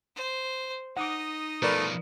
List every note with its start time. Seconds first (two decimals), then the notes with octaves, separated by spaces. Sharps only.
0.16 C5
0.97 D#4 D#5 F#5 D6
1.62 B2 F3 A3 A#4 B4 D5